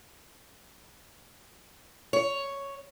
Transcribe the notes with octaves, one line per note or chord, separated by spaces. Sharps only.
C#5